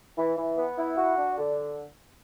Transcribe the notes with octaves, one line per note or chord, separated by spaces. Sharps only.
E3
E3
B3
E4
F#4
D4
D3